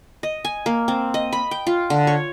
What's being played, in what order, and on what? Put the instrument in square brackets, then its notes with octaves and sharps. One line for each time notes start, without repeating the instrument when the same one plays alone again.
[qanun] D#5
G#5
A#3
C4
D#5
B5
G5
F4
D3
C#5